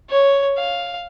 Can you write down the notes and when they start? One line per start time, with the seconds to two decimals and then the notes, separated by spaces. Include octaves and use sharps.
0.10 C#5
0.57 F5